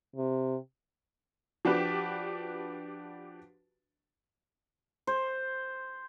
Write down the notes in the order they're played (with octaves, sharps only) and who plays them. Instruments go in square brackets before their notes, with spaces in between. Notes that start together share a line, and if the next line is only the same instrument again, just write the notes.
[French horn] C3
[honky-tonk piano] F3 D4 F#4 G4 B4
[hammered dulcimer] C5